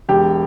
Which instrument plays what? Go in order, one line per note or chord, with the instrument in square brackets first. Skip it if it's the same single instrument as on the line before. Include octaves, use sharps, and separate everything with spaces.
[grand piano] E1 G4